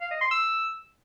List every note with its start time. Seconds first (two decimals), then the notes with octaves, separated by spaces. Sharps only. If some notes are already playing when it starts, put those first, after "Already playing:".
0.01 F5
0.11 D#5
0.21 C6
0.31 E6